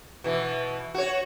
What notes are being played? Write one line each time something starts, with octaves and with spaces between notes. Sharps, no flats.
B2 E3
F#4 C#5